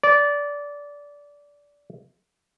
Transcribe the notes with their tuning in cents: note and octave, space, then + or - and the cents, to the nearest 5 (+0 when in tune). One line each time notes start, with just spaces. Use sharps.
D5 -20